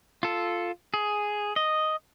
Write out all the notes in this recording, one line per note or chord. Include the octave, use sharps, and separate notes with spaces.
F4 A4
G#4
D#5